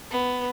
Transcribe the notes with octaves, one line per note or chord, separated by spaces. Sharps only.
B3